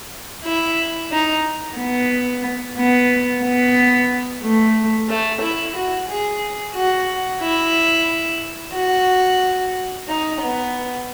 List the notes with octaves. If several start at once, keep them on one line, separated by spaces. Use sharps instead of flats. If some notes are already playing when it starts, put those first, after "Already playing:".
E4
D#4
B3
B3
B3
A3
A3
E4
F#4
G#4
F#4
E4
F#4
D#4
B3